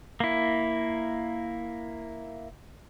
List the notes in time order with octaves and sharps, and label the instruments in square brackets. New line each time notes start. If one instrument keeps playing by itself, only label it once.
[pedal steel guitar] A#3 E4